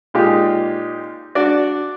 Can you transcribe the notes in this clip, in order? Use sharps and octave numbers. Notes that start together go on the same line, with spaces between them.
A#2 G#3 D#4 F4 G4
D4 F#4 D5